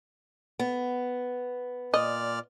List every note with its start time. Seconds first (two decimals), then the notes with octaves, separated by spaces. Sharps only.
0.59 B3
1.94 A#2 D5 D#5 F6